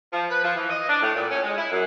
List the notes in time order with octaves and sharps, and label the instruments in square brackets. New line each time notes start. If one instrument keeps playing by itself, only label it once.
[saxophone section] F3
B4
F3
E3
D#5
D4
A2
A#2
C#4
G#3
E4
F#2